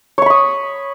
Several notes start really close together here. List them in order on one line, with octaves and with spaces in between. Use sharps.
C#5 C#6 B5 D#6